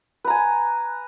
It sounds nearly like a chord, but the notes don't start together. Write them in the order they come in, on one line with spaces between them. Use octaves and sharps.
B4 A#5 G#5